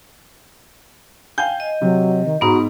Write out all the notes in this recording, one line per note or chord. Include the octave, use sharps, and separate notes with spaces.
F5 G5 G#5 G6
D#5
C3 F#3
D#3
G#2 B3 D#4 F#4 A#5 B5